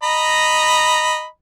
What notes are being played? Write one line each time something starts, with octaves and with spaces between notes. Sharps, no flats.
D#5 A#5 B5